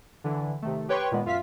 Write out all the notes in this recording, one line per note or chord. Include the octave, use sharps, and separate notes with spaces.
D3 E3
C3 D#3 A3
G4 B4 C#5 G5 C6 C#6
A#2 D#3 G#3 B3
F#2 F4 E5 F5 B6